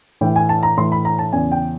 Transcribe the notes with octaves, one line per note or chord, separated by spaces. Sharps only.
A2 E3 G5
G#5
A5
A#5
A2 E3 C6
B5
A#5
A5
E2 C#3 E3 G#5
G5